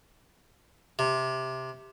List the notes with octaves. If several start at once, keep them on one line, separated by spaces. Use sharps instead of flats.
C3